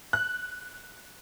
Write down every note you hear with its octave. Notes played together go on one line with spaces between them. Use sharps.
F#6